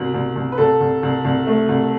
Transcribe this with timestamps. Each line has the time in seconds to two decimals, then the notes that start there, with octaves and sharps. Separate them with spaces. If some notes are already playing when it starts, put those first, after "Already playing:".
Already playing: C2 B2
0.14 C2
0.36 C2
0.52 B4
0.58 C2 A4
0.80 C2
1.03 C2
1.25 C2
1.47 A3
1.69 C2